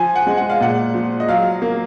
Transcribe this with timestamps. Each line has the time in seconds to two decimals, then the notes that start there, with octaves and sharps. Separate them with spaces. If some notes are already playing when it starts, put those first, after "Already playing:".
Already playing: F3 G#5
0.15 F#5
0.27 G#3
0.37 F#5
0.50 F5
0.60 A#2 F#5
0.94 F3
1.20 D#5
1.29 F#3 F5
1.62 A#3